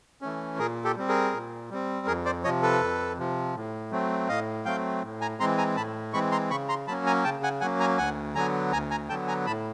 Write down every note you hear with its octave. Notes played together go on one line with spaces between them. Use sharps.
E3 A3 C#4
A#2 G#4 A#4
G4 A4
G3 C4
G#4 A#4
A#2
G3 C4
F2 G#4 A#4
C5 D5
C3 F3 C#5 D#5
A4 B4
F2
C3 F3
A2
F#3 A3 C4
A2 D#5 F5
F#3 A3 C4 F5 G5
A2
G#5 A#5
E3 G#3 C4 A#5 C6
G#5 A#5
A2 A5 B5
E3 G#3 C4 B5 C#6
A#5 C6
C#3 B5 C#6
A#5 C6
F#3 A#3 C#4 A5 B5
G#5 A#5
C#3 G5 A5
F#5 G#5
F#3 A#3 C#4 F#5 G#5
G#5 A#5
D2 F#5 G#5
D3 F#3 B3 G#5 A#5
D2 G#5 A#5
G#5 A#5
D3 F#3 B3 G5 A5
G#5 A#5
A2 A5 B5